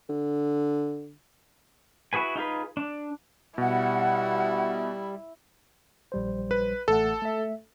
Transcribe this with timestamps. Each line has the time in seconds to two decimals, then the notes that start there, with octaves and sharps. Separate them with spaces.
0.09 D3
2.13 E4 F#4 G#4 B4 G#5
2.36 D#4 F4 G#4 B4
2.77 D4
3.58 B2 G3 E4 F#5
6.12 A#1 G3 C5
6.51 B4
6.88 A1 A3 A4 F#5
7.22 A3 E5